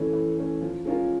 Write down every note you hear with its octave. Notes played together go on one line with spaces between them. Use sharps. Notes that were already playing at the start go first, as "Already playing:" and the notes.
Already playing: E3 A3 C#4
E3
A3 C#4
F3
G#3 C#4 F4 A#4